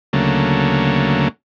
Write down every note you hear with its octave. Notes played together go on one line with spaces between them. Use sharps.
D2 C#3 F#3 A3 A#3